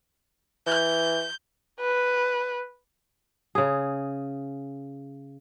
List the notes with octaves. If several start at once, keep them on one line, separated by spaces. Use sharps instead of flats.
E3 G6
B4
C#3 G#4